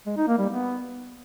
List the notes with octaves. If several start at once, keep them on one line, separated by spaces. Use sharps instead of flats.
G#3
D#4
A#3
G3
B3